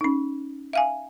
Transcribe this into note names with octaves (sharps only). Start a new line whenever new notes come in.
C#4 D#4
E5 F5 G#5